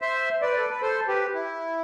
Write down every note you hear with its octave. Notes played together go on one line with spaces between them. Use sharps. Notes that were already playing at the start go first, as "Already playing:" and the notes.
C5 E5
B4 D5
A4
B4
A4 C5
G4 B4
E4